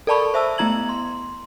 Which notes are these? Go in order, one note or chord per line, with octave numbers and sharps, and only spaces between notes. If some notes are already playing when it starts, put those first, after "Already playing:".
A4 A#4 D5 A5 B5 C#6
C5 E5 A5 E6
A3 B3 E4 A#5 G#6 F#7
C6